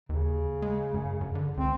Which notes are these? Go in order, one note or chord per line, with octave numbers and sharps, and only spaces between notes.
D#2 C#3
G#3
F#2
F#2
D3
C#2 C4